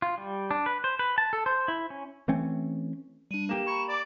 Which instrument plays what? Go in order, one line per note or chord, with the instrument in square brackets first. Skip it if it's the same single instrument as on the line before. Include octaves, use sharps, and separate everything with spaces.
[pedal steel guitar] F4
G3
D4
B4
C5
B4
A5
A4
C5
E4
C#4
[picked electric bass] E3 A3 C4 C#4
[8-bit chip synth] G3 D4 [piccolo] D#7
[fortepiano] A#3 G4 [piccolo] E7
[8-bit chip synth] A#5 B5 [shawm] C#6
[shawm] D5 [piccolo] D6